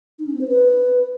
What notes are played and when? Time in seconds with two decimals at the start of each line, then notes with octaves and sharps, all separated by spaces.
0.19 D#4
0.26 C#4
0.34 C4
0.41 C5
0.48 B4